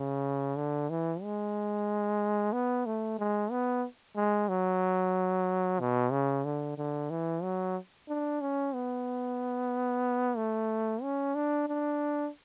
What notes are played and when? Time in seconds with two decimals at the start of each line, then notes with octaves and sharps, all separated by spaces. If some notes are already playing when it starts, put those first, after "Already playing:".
Already playing: C#3
0.57 D3
0.90 E3
1.22 G#3
2.53 B3
2.86 A3
3.19 G#3
3.51 B3
4.16 G#3
4.49 F#3
5.80 B2
6.12 C#3
6.45 D3
6.78 D3
7.10 E3
7.43 F#3
8.09 D4
8.41 C#4
8.74 B3
10.37 A3
11.02 C#4
11.35 D4
11.68 D4